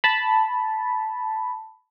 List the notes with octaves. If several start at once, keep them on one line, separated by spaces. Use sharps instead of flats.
A5 B5